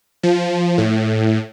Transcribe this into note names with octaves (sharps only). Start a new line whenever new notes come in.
F3
A2